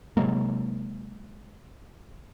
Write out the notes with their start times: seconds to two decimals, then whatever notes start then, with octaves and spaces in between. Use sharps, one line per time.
0.17 C3 F#3 G#3 A#3